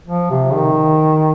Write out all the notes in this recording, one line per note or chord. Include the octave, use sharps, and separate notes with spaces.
F3
C3
D#3